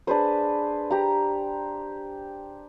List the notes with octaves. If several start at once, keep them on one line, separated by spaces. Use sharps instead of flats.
D4 G#4 B4 C5
G4 A#5